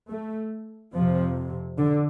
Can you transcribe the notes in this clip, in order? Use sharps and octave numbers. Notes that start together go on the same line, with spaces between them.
A3
F2 C3 F3
D3